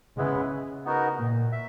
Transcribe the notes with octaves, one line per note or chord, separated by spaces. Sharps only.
C#3 G#3 B3 E4 B4
B3 D#4 F#4 A#4
A#2
E5